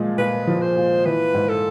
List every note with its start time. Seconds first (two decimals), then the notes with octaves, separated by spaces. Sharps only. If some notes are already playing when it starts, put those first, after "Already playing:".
Already playing: A#2 F3 G#3
0.18 A#2 B4
0.47 F3
0.62 C5
0.76 A#2
1.05 E3 B4
1.34 G#2
1.49 A4